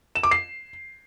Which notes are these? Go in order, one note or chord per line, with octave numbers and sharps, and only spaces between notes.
E7
D6
C7